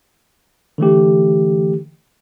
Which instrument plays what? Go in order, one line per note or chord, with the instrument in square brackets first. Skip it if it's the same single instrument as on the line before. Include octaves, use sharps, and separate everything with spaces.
[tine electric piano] D3 E3 A3 G4